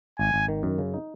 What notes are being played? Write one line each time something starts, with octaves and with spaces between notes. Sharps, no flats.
G#1 G#5
G#1
D#3
F#2
C#3
D#4